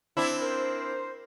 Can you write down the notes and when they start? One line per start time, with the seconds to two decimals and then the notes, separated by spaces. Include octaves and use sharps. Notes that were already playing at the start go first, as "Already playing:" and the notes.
0.17 C4 D4 E4
0.42 A#4 C5